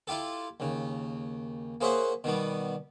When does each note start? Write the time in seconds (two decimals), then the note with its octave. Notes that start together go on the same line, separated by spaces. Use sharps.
0.07 E4 F4 G4 A4
0.60 D#2 C#3
1.81 A#3 G#4 C5 C#5 E5 F#5
2.24 B2 D#3 G3 B3